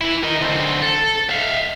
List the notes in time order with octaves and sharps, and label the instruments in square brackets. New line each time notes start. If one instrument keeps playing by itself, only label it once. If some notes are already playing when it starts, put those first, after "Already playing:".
[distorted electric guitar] E3 E4
A#4 D#5
D3 C4
A4
E5 F5